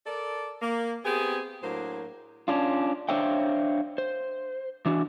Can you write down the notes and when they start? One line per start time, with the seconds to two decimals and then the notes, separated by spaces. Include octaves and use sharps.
0.07 A4 A#4 D5
0.62 A#3
1.05 B3 C4 G4 G#4
1.63 A2 F#3 A#3 D4 C5
2.48 C#4 D4 F4
3.09 D4 C5 C#5 E5 F5 G5
3.98 C5
4.85 E3 D4 F#4